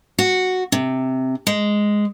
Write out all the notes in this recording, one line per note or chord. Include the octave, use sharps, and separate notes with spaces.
F#4
C3
G#3